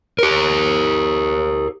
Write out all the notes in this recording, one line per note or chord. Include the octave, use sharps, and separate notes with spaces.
G4 A#4